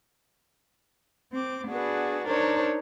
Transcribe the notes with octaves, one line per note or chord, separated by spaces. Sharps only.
C4 D6
B3 D4 F#4 G#4 B4
D4 D#4 A#4 C5 C#5